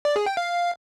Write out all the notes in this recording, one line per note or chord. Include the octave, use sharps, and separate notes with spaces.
D5
G#4
G5
F5